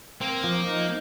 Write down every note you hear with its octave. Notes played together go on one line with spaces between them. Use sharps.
A#3 C4
F3
D#4